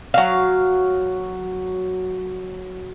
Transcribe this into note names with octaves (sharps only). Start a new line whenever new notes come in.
F#3 F5